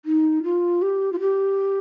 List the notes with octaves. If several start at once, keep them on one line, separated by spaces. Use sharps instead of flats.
D#4
F4
G4
F4
G4